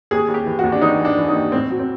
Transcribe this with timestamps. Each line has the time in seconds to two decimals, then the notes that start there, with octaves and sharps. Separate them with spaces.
0.11 D#2 G#4
0.28 D#2
0.34 G4
0.46 E3
0.59 F#4
0.64 D#2
0.72 D4
0.82 E3 D#4
0.99 E3
1.05 D4
1.17 E3
1.28 D#4
1.35 D#2
1.52 A2 C4
1.70 F#3
1.79 C4